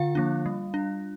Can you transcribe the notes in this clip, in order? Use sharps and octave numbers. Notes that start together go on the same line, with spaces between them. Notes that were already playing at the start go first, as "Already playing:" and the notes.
Already playing: D3 F4 F5
F3 A#3 D4
G3
D4